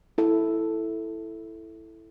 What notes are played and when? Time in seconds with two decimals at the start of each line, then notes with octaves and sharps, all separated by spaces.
0.18 E4 A4